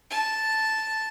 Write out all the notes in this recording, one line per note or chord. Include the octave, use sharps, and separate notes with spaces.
A5